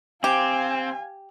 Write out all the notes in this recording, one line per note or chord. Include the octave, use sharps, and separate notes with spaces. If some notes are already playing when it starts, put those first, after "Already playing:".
C4 G4 F5 G#5